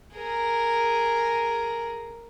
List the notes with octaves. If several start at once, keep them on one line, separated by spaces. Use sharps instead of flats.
G#4 A#4